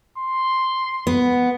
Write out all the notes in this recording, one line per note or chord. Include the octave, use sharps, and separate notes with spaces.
C6
B3